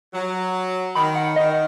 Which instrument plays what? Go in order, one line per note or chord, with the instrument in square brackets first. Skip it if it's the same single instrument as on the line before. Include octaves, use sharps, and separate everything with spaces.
[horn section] F#3
[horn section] D#3 [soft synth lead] B5
[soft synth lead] F#5
[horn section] D#3 [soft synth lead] D#5